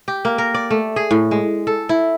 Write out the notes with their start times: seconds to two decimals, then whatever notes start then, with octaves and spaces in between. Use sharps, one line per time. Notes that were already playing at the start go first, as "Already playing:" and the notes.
0.08 G4
0.25 A#3
0.38 A#4
0.54 D5
0.71 A3
0.96 G#4
1.11 A2
1.31 G#3
1.67 A4
1.89 E4